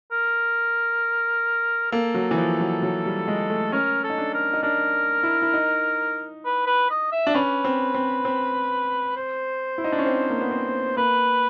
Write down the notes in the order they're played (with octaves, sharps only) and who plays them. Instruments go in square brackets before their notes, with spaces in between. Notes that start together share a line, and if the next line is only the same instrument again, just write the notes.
[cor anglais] A#4
[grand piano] A#3 [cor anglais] A4
[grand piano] F#3
E3
F3
F#3
F#3
G3
G#3
A3
[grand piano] C#4 [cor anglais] A#4
[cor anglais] A4
[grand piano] D#4
D4
[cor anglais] A#4
[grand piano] D#4
[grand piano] D4 [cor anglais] A#4
[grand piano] E4
E4
D#4
[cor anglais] B4
B4
D#5
E5
[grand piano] D4
[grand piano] C#4 [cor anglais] B4
[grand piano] C4
C4
C4
[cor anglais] C5
[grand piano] E4
D#4
D4
C#4
C4
A#3
B3
C4
[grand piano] A#3 [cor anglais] B4